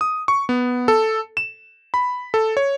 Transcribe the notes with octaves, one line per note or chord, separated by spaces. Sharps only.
D#6
C#6
B3
A4
E7
B5
A4
C#5